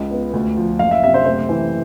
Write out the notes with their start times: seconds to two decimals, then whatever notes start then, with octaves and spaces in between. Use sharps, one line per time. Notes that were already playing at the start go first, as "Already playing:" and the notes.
Already playing: C#2
0.11 B3
0.33 D2
0.57 F3
0.79 F#1 F5
0.91 E5
1.04 C3 E5
1.14 C5
1.25 A3 C5
1.49 E3